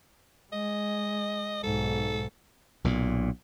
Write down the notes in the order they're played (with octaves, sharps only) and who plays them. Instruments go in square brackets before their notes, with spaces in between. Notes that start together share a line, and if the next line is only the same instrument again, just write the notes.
[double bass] G#3 [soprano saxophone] D#5
[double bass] B1 G#2 [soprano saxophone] A4
[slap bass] B1 A#2